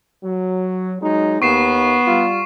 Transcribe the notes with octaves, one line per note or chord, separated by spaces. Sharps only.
F#3
F#3 G#3 D#4
D#2 B3 C#6 C7 E7
G3 F4